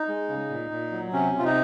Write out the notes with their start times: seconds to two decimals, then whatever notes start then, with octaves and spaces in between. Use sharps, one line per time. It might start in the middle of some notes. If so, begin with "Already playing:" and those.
Already playing: D#4
0.08 G#3
0.29 C#3
0.50 A#2
0.71 A#2
0.92 F#3
1.13 C3 C#4
1.34 C3 F4
1.45 D#4